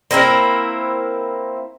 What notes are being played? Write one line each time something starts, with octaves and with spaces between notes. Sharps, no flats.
A#3 C4 E4 A#4